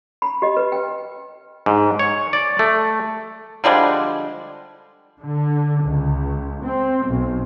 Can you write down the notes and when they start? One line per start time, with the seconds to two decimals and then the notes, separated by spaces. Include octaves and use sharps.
0.22 B5
0.42 G4 D#5
0.57 B4
0.72 G5
1.66 G#2
1.99 C#5
2.33 D5
2.59 A3
3.64 D3 F3 G3 G#3
5.22 D3
5.85 C#2
6.63 C4
7.07 B1